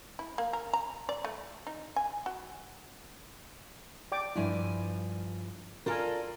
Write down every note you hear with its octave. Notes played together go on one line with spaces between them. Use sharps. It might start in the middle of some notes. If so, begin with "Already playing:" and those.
E4
A#3
A#4
A#5
D5
A3
D#4
G#5
F#4
D5 G5 D6
G2 F3 E4 G#5
F4 A4 A#4 D5 G#5